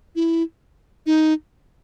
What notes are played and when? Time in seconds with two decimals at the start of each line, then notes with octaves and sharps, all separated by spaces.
0.16 E4
1.06 D#4